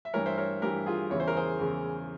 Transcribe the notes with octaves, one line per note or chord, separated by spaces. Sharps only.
E5
G2 E3 A#4 C#5
C5 E5
A#4 C#5
G2 E3 G4 A#4
F4 G#4
E2 C#3 E3 C#5
C5
A#4
G#4 C5
E2 C#3 E3